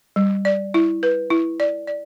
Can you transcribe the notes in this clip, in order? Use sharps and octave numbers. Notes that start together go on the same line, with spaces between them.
G3
D5
E4
B4
E4
D5
D5